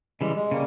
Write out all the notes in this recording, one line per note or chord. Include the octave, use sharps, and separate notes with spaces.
C#3 E3 G3 G#3
G#3
C#3 G3 A#3